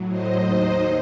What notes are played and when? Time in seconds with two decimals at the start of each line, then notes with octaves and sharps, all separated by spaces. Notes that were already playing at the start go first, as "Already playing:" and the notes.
Already playing: A2 F#3
0.09 C5 D#5
0.37 D#2 D#3 F#3